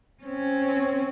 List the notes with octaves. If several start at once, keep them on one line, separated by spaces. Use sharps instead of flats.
C4 C#4